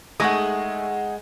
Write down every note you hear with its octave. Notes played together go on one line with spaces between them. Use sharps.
G#3 A3 D#4 G#4 F#5 C#6 D#6